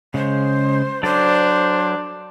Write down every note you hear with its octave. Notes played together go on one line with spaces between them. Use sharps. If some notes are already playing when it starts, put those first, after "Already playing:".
C#3 G#3 C5
F#3 D4 A4 C5 D5